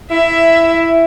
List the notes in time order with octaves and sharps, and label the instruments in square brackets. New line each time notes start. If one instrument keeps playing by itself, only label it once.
[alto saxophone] E4 [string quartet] E5